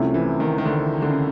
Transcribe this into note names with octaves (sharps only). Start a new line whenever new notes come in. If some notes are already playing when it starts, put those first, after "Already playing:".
Already playing: C2 C3 F3 A3 C#4
E3
D#3
D#3
D3
D3
C#3